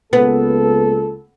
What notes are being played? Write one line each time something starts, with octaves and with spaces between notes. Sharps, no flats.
C#2 A#3 B3 A4